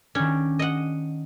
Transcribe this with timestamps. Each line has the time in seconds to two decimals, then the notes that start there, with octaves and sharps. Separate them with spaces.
0.15 D#3 C#4 D4
0.59 D#5 F#5
0.77 D#7